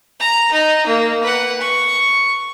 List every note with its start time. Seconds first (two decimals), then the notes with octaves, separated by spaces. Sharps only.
0.20 A#5
0.52 D#4
0.87 A#3
1.23 B4 F#5
1.61 C#6